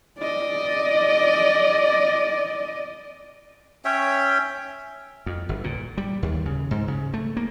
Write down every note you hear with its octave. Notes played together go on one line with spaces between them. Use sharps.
D5 D#5
C#4 C#5 E5 G5
F2
G1
A#2
G3
D#2
C#3
G#2
C#3
A3
A#3